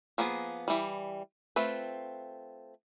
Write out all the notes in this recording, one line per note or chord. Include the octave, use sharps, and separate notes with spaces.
F3 A#3 B3 G#4
E3 G3
A3 C4 F4 B4